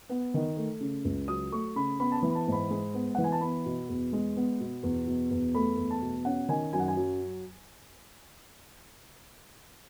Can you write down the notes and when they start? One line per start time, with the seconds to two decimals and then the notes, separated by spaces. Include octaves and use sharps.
0.09 B3
0.34 D#3
0.57 A3
0.80 C#3
1.05 C#2
1.28 F#3 D#6
1.52 A3 C#6
1.76 C#3 B5
1.99 B3 B5
2.12 A5
2.18 B5
2.22 E3
2.30 B5
2.35 A5
2.47 G#2
2.52 B5
2.70 G#3
2.94 B3
3.15 E3 F#5
3.24 G#5
3.32 A5
3.41 B3 B5
3.66 B2
3.89 E2
4.13 G#3
4.37 B3
4.60 B2
4.83 E2
5.07 B2
5.31 E2
5.54 A3 B5
5.77 E2
5.90 A5
6.02 B2
6.25 C#4 F#5
6.49 D#3 G#5
6.73 F#2 G#5
6.80 F#5
6.88 G#5
6.97 F#3